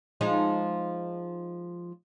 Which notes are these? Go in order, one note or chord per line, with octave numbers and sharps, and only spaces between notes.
F3 G#3 D#4